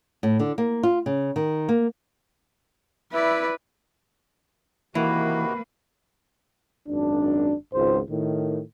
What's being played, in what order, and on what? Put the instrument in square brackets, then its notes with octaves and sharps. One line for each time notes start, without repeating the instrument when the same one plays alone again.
[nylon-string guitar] A2
D3
A#3
F4
C#3
D#3
A#3
[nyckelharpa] E4 D5 [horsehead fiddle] B4 [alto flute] E5
[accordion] C3 D#3 F#4 [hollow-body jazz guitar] E3 [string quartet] A#3 [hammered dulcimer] B4
[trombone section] G#1 F#2 D4
G#1 C#2 G#2 F4 C5
A2 D#3